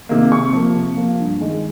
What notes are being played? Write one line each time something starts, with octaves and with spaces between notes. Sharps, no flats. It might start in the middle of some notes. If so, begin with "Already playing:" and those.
C3 D#3 A#3
C3 C#6
F3 A#3
C3
F3 A#3
G2
D#3 G#3